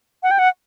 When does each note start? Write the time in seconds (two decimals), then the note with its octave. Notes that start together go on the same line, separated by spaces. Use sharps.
0.23 F#5
0.31 G5
0.39 F#5